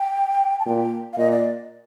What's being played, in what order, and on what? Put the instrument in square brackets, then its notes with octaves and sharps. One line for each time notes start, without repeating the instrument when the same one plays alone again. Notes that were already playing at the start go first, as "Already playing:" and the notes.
Already playing: [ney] G5
A5
[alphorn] A#2 [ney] G5
[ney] F5
[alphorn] A#2 [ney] D#5
[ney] D5